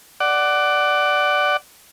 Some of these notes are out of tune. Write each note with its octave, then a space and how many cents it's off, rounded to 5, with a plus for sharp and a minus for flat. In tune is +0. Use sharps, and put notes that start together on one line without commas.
D5 +0 F#5 +20